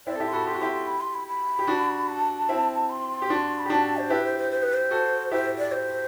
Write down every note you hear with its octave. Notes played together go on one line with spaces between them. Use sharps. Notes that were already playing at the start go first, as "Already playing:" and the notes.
C4 E4 D5
A4
E4 G4
C6
F#4 A4 B5
G4 C6
F#4
E4 G4 C6
C6
B5
C6
B5
B5
G4
D4 F#4
A5
C4 E4
C6
G4
D4 F#4
B5
G4
D4 F#4 A5
A5
C5
E4 G4 B4
C5
C5
C5
B4
C5
F#4 A4
E4 G4 C5
D5
C5